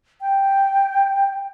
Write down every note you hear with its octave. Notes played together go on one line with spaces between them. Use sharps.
G5